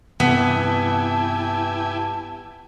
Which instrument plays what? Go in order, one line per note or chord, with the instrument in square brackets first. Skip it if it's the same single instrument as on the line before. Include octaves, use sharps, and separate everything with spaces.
[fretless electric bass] G2 C3 E3 [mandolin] B3 [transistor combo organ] E4 G4 G#5 [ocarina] A5